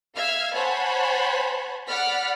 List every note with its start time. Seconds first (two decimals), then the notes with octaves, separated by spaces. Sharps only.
0.16 E5 F5 F6 G#6
0.54 C5 C#5 F#5 G#5 A5 B5
1.87 D5 F#5 B5 F6 B6